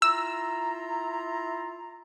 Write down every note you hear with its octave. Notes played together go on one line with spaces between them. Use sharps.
E4 F4 A#5 E6